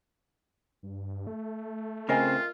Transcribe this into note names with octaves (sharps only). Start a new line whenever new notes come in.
G2
A3
C#3 C4 F4 A#4 D#5 G#5